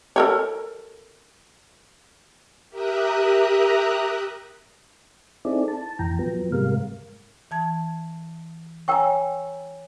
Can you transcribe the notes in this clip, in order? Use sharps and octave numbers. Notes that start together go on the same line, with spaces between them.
A4 A#4 C#5
G4 A#4 E5 A#5 D#6 F#6
C4 D#4 E4 G#4 A4 D5
A5
F2 A#2 E3 G5 A#5
F3 F#3 B3
G#2 C3 G3 G#3 A#4 F5
E3 A5 G#6
A#4 C#5 G5 G#5 A#5 C#6